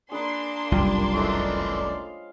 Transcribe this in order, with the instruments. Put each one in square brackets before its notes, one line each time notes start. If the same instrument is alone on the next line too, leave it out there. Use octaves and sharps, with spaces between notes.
[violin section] A#3 D4 C6 [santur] G#4 B4
[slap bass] F#1 C2 F2 [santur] F4 G4 B4
[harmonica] E3 A3 D5 [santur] G#3 C#4
[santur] C5 F5